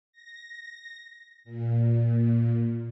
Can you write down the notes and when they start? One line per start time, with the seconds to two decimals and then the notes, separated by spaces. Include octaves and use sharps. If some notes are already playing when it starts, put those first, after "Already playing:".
0.12 A#6
1.44 A#2